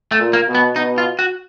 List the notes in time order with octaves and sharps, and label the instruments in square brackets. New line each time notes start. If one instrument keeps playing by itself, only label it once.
[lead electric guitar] A3
[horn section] A#2
[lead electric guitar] A#3
[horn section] B2
[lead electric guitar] B3
[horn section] B2 [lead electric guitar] D#4
[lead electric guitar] F4
F#4